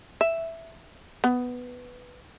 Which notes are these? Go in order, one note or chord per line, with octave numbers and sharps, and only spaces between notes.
E5
B3